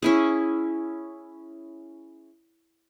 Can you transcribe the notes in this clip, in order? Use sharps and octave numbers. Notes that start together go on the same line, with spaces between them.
C#4 E4 G#4